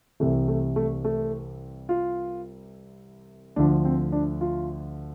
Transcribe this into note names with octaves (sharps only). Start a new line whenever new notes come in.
C2 C3 E3 A3
A3
A3
A3
F4
D2 D3 F3 D4
C4
D4
F4